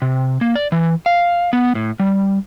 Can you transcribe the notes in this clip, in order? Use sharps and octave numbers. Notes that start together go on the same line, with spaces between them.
C3
A#3
D5
E3
F5
B3
A2
G3